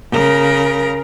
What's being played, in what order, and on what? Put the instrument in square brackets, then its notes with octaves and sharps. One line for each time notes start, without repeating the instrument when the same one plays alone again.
[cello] C#3 A#4